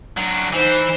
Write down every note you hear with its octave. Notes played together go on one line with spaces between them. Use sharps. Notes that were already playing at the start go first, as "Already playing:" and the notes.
F#3 D4
E3 D#4 C5